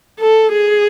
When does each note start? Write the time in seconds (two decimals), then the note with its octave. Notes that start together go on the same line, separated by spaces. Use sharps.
0.20 A4
0.52 G#4